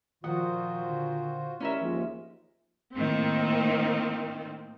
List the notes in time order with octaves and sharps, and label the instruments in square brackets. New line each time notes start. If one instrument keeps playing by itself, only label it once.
[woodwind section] A#2 D#3 [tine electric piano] F3 D#6 [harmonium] F4 F#4 C5 [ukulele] F#5
[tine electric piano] D3
[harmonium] D#3 G3 E4 [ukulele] C#4 A#4 E5
[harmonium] D#2 G#2 G#3 [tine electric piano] F3 A#3 F4
[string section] A2 D#3 A#3 C4